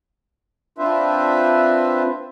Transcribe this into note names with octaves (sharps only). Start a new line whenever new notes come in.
C4 D4 F4 B4 C5 E5